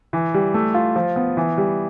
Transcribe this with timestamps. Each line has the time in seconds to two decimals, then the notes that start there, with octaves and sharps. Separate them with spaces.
0.13 E3
0.34 G3
0.54 A3
0.74 F4
0.96 F3
1.16 B3
1.37 E3
1.58 G3